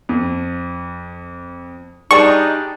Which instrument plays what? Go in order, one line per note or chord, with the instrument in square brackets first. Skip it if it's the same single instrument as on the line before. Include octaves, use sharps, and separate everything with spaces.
[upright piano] F2
[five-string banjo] G3 D4 [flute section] D#4 [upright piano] G#4 D5 A5 [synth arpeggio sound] C#6